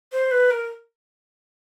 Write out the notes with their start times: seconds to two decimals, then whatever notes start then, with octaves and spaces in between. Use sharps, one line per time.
0.12 C5
0.31 B4
0.51 A#4